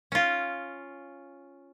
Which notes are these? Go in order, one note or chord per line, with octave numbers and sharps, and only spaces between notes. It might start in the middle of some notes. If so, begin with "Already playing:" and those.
C#4 F4